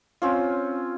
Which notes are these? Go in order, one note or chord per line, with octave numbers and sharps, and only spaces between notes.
C4 C#4 F4